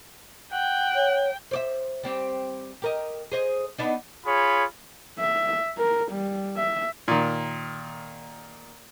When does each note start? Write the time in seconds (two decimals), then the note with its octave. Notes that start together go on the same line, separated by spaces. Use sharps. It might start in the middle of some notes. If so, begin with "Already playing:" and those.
0.53 F#5 G5
0.95 C#5
1.51 C5 D5 E5
2.04 G3 C4 G4
2.82 G4 A#4 D#5
3.32 G#4 C5 D#5
3.78 B3 D4 D#4
4.26 F4 G#4 C#5 B5
5.19 E5
5.78 A#4
6.11 G3
6.56 E5
7.08 A#2 D#3